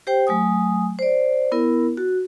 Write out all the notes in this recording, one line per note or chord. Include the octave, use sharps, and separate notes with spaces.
G4 C5 G5
F#3 A3 G#5 D#6
C5 D5
B3 E4 A#4
F#4